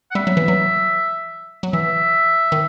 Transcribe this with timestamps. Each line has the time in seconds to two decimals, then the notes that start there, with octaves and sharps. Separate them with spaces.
0.11 F#5
0.15 G3 E5
0.27 F#3
0.37 E3
0.48 F#3
1.63 F#3
1.73 E3 E5
2.52 D#3